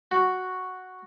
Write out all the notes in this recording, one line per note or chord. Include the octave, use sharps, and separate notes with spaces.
F#4